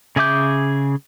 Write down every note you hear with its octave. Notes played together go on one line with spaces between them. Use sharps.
C#3 G#4 E5 D6 G6